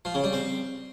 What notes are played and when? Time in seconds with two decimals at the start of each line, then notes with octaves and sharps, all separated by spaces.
0.05 F3
0.14 C#3
0.24 G3
0.33 C4